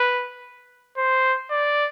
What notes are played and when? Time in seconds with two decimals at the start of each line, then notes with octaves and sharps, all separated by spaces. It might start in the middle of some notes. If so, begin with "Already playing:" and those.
Already playing: B4
0.98 C5
1.51 D5